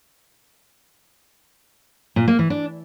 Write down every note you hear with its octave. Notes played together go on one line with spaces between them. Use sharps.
A#2
A#3
E3
D4